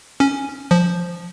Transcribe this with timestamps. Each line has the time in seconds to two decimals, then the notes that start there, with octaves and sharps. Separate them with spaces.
0.20 C#4
0.71 F3